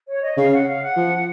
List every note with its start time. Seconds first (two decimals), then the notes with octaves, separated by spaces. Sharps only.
0.08 C#5
0.23 D#5
0.38 C#3 F5
0.53 F#5
0.67 F5
0.82 F#5
0.96 F3